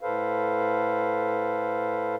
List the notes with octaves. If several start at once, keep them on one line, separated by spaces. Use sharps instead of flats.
A2 A4 B4 C5 F5